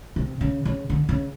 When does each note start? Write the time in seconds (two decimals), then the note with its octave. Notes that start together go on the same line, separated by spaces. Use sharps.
0.16 C3
0.41 C#3
0.65 C#3
0.90 D3
1.09 C#3